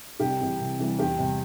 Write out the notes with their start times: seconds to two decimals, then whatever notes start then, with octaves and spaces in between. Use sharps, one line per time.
0.20 C2 G4
0.40 C3 E3 G3
0.60 C2
0.79 C3 E3 G3
0.99 E2 G4
1.19 C3 G3